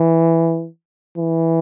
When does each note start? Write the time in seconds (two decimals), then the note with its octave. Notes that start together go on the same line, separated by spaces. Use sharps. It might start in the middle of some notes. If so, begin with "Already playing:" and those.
Already playing: E3
1.18 E3